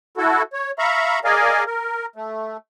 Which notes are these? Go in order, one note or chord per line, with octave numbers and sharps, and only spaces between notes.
E4 F#4 A4
C#5
E5 F5 A#5 B5 C#6
G#4 A#4 D5 D#5 F5 G#5
A#4
A3